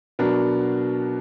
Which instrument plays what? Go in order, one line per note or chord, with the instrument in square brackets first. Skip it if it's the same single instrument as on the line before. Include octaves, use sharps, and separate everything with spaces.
[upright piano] B2 F#3 B3 D4 A#4